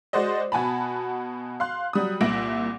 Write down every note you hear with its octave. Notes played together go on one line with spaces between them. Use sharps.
G#3 F#4 C5 D5 D#5
B2 F#4 G#5 A5 B5
F5 C6 F#6
F#3 G3 D#6
C2 A#2 E5 A#6 D7 F#7